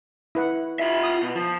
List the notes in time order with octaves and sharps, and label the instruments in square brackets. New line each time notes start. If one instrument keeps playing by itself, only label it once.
[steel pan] E4 B4 F#5
[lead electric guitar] F4 E5
[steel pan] D#6
[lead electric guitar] B2
F3